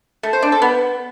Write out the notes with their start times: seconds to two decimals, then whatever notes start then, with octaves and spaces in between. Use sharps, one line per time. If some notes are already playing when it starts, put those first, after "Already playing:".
0.23 A3
0.33 C5
0.43 D4
0.52 A4
0.62 B3